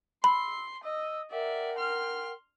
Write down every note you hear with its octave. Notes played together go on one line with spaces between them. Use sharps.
B5 C6 E6
D#5 E6
A#4 D5 E5 F#5 G5
C6 F6